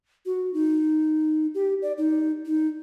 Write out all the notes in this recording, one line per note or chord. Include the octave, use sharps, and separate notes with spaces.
F#4
D#4
G4
D5
D#4
D#4